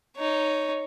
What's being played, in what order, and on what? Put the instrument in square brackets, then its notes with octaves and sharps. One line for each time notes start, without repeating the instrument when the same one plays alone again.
[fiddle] D#4 C#5